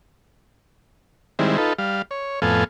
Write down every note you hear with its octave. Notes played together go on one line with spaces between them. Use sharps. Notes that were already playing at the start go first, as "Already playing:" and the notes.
D#3 G3 G#3 C4 E4
D#4 F4 A4 B4
G3 F5
C#5
F2 A2 B3 A4 F5 G#5